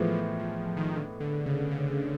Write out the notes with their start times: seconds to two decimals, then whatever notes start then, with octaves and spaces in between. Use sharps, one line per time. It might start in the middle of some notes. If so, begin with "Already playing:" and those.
Already playing: A2 E3 F3 G#3 B3
0.20 F3
0.39 F3
0.77 D#3
0.96 D3
1.20 D3
1.46 C#3
1.71 C#3